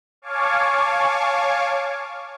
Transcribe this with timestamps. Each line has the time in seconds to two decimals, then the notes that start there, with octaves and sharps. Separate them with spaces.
0.22 C#5 F5 G#5 A5 C#6 D6